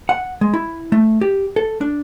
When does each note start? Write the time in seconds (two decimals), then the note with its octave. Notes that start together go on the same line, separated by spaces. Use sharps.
0.09 F#5
0.41 G#3
0.54 E4
0.92 A3
1.21 G4
1.56 A4
1.81 D4